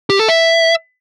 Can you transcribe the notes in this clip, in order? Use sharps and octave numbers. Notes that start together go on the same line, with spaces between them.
G4
A4
E5